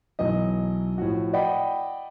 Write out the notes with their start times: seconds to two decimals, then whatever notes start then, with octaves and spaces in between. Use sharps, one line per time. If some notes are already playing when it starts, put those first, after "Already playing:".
0.19 B1 E3 F#3 D#5
0.98 A2 F3 F#4
1.33 D5 D#5 F#5 G5 B5